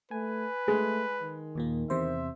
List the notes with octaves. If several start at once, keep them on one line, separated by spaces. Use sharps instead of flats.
A3 B4 G#5
G#3 A3
D#3
D#2 A#2 A#3
E2 C3 C5 E5